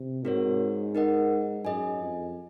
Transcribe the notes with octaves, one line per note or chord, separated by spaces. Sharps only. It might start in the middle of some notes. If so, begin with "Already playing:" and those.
Already playing: C3
G#2 C4 F#4 A#4 C#5
D#4 A#4 D#5 F#5
F#2 G#4 D#5 G#5
F2